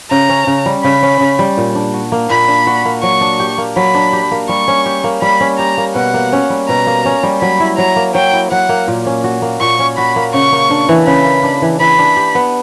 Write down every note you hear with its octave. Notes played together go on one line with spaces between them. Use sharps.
C#3 A#5
C#4
C#3
G3
C#3 B5
C#4
C#3
G3
A#2
D4
F#4
A#3
A#2 B5
D4
F#4
A#3
F#3 C#6
D4
G4
A#3
F#3 B5
D4
G4
A#3
G3 C#6
C#4
G4
A#3
G3 B5
C#4
G4 A#5
A#3
B2 F#5
A#3
C#4
G3
B2 A#5
A#3
C#4
G3
F#3 B5
E4
F#3 A#5
A#3
F#3 G5
E4
F#3 F#5
A#3
A#2
C#4
F#4
A#3
A#2 C#6
C#4
F#4 B5
A#3
C#3 C#6
A#3
D4
E3
C#3 B5
A#3
D4
E3
E3 B5
D4
G4
B3